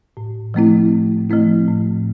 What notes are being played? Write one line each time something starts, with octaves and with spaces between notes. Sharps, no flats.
A2
F3 A3 C4 E4
A2
F3 A3 C4 E4
A2